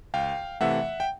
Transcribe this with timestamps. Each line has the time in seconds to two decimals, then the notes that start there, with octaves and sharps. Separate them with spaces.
0.14 C#2 F5 G5
0.61 C3 E3 A3 E5 F#5
1.00 G5